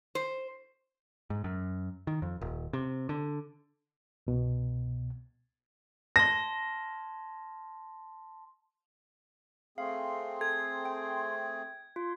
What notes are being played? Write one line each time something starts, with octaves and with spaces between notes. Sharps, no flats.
C5
G#2
F#2
D#3
F2
D#1
C3
D3
C2 B2
A5 C6 A#6
A3 C4 G#4 F5 C6
A4 G#6
G5
F4 C6